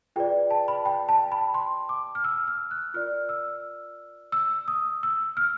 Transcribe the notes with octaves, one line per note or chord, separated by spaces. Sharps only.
F4 G#4 B4 D5 G5
A5
B5
G5
A5
B5
C6
D6
F6
E6
F6
F#6
F4 A#4 D5 F6
E6
E6
D#6
E6
F6